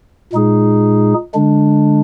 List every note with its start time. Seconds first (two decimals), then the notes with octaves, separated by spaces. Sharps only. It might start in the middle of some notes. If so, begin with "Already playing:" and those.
0.33 A#2 G#3 D#4 G#4
1.34 D3 G#3 D4